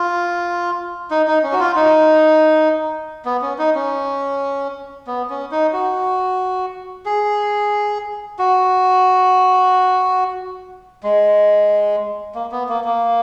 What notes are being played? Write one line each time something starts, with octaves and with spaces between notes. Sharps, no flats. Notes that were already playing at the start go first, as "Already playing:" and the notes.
Already playing: F4
D#4
D#4
C#4
F#4
F4
D#4
B3
C#4
D#4
C#4
B3
C#4
D#4
F#4
G#4
F#4
G#3
A#3
B3
A#3
A#3